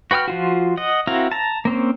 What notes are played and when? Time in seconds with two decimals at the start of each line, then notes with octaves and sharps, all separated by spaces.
0.11 F#4 B4 G5 D6 F6
0.28 F3 F4 F#4
0.77 D#5 F#5
1.07 C4 E4 F#4 A#4 F5
1.32 A5 A#5
1.65 A#3 C4 C#4